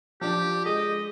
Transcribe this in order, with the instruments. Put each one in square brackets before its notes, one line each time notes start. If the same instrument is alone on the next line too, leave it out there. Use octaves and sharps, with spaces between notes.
[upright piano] F3 D4 [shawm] G4
[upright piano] G#3 [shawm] D#5